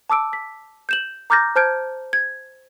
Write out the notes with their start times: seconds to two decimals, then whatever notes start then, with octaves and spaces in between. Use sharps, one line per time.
0.10 A5 D6 E6 D7
0.33 B6
0.89 G6 E7 F#7
1.30 A#5 D6 F6 G6 A6 A#6
1.56 C5 A5 F6 G6 G#6 D7
2.13 G#6